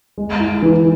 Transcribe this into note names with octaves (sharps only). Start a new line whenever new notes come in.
G#3
E4
E3